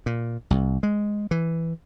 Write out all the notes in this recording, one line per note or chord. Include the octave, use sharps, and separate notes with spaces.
A#2
C2
G#3
E3